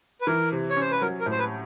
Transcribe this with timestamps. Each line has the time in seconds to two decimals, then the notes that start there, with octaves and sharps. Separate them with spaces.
0.21 B4
0.27 E3 A#4
0.52 C3
0.70 C#5
0.77 C#4 C5
0.91 B4
1.01 F#3 A#4
1.21 A#4
1.26 A2
1.32 C5
1.39 B4